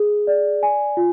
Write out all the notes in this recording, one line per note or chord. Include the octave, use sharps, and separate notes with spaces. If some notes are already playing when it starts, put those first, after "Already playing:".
Already playing: G#4
D5
G#5
F4